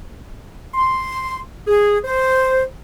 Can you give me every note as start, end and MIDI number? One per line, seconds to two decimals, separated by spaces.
0.74 1.38 84
1.67 1.97 68
2.05 2.63 72